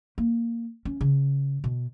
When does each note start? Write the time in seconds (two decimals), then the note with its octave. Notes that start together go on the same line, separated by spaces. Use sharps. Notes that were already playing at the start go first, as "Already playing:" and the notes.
0.18 A#3
0.85 C#4
1.01 C#3
1.64 B2